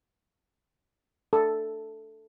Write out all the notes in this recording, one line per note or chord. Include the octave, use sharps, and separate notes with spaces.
A4